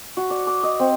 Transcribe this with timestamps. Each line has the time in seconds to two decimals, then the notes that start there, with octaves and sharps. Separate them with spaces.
0.17 F#4
0.30 D5
0.47 D6
0.63 D#5
0.80 C4